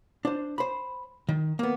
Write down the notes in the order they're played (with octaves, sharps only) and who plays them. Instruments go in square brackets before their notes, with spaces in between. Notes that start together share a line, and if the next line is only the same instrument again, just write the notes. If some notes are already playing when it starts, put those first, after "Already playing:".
[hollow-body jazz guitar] D4 C5
C5 B5
D#3
A#3 B3